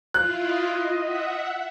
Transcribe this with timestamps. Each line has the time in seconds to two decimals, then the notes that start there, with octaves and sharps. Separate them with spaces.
0.14 E4 F4 F#6
0.44 D#5
1.01 E5 F#5